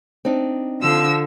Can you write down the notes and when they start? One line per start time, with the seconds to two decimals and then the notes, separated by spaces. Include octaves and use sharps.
0.25 C4 D4 D#4
0.80 D3 F3 E6